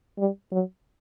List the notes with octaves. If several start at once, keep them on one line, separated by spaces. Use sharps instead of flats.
G3
F#3